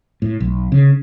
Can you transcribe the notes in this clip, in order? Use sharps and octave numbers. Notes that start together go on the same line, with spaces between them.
A2
B1
C#3